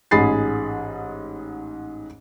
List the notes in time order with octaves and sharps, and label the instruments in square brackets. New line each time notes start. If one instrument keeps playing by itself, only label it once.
[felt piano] A1 G#2 G#4 B5 A6 C7